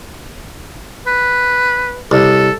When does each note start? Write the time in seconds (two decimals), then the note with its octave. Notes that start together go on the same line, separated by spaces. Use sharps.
1.07 B4
2.11 C2 A4